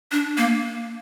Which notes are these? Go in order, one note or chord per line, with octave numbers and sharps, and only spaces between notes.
D4
A#3